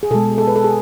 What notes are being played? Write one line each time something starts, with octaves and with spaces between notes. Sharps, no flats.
G#4
B2 G#3 A4
A4
B4
A4
G#4